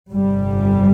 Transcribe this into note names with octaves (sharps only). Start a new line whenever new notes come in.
G1 F2 C3 G3